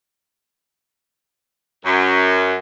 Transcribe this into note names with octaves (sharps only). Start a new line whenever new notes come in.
F#2